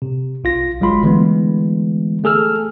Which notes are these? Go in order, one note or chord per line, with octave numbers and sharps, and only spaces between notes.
C3
B1 F4 A#6
G1 F#3 G#3 F4 B5 C6
D3 E3 G#3 A3 B3
A3 G#4 A4 E6 F6